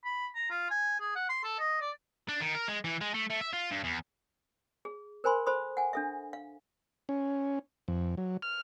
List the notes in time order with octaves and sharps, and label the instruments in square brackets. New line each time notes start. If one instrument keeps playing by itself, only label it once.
[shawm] B5
A#5
F4
G#5
G#4
F#5
C6
A4
D#5
D5
[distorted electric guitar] D4
D#3
A#4
G#3
E3
G#3
A3
A3
E5
F4
G2
E2
[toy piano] G#4
A#4 C5 G#5 B5 C6
A4 C5 B5 C6 D#6
F#5 G#5
D4 A4 E5
F5
[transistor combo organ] C#4
F2
F#3
F6